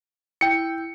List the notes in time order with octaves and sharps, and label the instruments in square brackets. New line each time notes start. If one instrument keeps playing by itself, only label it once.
[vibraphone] E4 [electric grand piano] G5 C#7